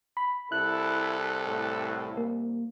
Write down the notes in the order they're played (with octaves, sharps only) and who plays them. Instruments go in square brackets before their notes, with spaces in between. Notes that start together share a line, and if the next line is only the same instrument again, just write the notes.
[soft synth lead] B5
[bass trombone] C2 [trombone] E4 [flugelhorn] A4 [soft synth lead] F#6
[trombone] A2
[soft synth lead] A#3